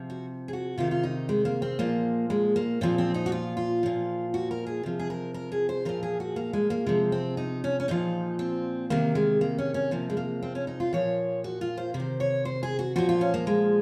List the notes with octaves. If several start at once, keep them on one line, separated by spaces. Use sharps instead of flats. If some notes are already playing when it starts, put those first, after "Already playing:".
Already playing: C3 F3
F#4
G#4
F#4
C3 D#3 F4
F4
D#4
G#3
A#3
C4
A#2 F3 A#3
G#3
A#3
A#2 F3 C4
C4
D#4
F#4
F4
F4
A#2 F3
F#4
A#4
G#4
C3 F3
G#4
A#4
A#4
G#4
C5
A#2 F3 A#4
G#4
F#4
A#3
G#3
A#3
C3 F3 G#3
C4
D#4
C#4
C#4
A#2 F3 D#4
C4
C3 D#3 A#3
G#3
A#3
C#4
C#4
C3 F3 A#3
G#3
A#3
C4
C#4
D#4
F4
A#2 F3 C#5
F#4
F4
C5
C3 C5
D#3
C#5
C5
G#4
F#4
A#2 F3 F#4
F4
C#4
A#3
G#3